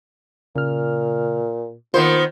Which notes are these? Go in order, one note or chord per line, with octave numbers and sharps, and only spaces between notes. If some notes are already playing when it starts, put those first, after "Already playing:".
A#2 C#3 F6
D#3 A#3 B3 F4 C5